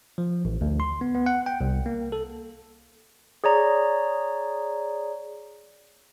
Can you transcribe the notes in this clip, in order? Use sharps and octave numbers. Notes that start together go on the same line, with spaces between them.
F3
A1
D2
C6
B3
B3
F#5
G5
C2
A#3
A4
G#4 C#5 D5 A#5